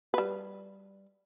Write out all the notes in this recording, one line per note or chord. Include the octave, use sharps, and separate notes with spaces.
G3 B4